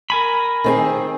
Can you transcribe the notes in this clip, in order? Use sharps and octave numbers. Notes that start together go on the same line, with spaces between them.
A#4 G#5 B5
D#3 C4 G#4